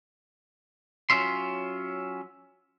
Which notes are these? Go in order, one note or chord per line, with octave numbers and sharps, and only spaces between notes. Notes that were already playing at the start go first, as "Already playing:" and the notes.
F#3 A3 C#4 F4 E5 C6